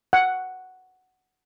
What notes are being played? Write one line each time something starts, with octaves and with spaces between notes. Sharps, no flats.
F#5